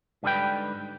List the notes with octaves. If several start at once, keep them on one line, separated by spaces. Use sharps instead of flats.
G#2 D3 G3 G#4 B4 G5